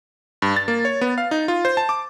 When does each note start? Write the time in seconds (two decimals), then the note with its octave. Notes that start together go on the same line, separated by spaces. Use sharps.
0.42 G2
0.56 A6
0.68 A#3
0.85 C#5
1.01 B3
1.18 F5
1.31 D#4
1.48 F4
1.65 C5
1.77 A5
1.89 D6